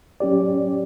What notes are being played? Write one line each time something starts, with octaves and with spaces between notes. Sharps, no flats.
F#3 C#4 G4 D5